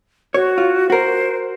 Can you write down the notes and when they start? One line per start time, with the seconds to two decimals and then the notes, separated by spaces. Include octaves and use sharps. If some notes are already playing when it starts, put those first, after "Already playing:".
0.34 F#4 C#5
0.58 F4
0.90 F#4 A#4 C5